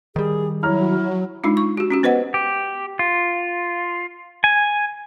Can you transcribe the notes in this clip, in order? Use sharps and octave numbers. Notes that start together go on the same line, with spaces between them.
D#3 G3 G#4
F#3 E4 C#5 A#5 F6
G#3 D4 D#4 F4
C#6
F#4 G4
C#4 F#4 G4
B3 B4 C5 D#5 F#5
G4
F4
G#5